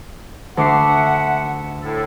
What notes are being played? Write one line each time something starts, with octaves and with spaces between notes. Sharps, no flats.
D2 E5 F#5 D6 C7
A2 A4